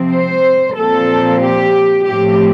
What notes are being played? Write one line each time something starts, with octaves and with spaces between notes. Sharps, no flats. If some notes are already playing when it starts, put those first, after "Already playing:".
Already playing: C3 F3 C4
C5
A#2 F3 C4 A4
G4
A2 F3 A3 C4 G4